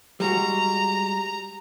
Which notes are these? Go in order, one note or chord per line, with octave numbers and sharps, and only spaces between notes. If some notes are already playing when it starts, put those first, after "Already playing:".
G3 G#3 F#4 A#5